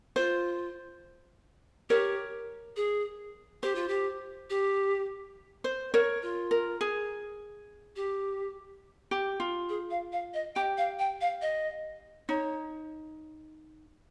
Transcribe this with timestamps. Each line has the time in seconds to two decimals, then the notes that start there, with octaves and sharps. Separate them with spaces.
0.16 F4 C5
1.89 G4 A#4 C#5
2.76 G#4
3.63 G4 C5
3.75 F4
3.88 G4
4.50 G4
5.64 C5
5.94 A#4 C#5
6.22 F4
6.51 A#4
6.81 G#4
7.96 G4
9.11 G4
9.40 F4
9.69 G#4
9.90 F5
10.12 F5
10.34 D#5
10.56 G4 G5
10.78 F5
10.99 G5
11.21 F5
11.42 D#5
12.29 D#4 C#5